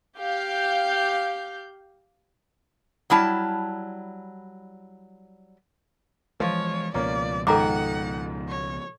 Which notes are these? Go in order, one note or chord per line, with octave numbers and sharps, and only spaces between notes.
G4 F5 G6
F#3 G3 E4 A5
E3 F3 G#3 F4 C#5
C#2 B2 F3 A#3 C#4 D5
G#2 D#3 A4 F#5 A#5 D6
C#5